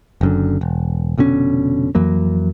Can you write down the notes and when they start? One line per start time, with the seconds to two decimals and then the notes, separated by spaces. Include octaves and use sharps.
0.21 F#1 F#2 D3
0.61 E1
1.18 F1 B2 D3 C#4
1.95 F2 E3 F#3 A#3